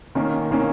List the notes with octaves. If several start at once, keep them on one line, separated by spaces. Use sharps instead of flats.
D#3 A#3 C#4
D#3 A#3 C#4